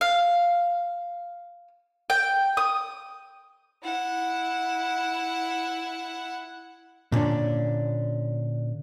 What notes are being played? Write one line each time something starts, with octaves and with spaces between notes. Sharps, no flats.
F5
G5
D#6
E4 F#5
A#2 D3 C#4 D4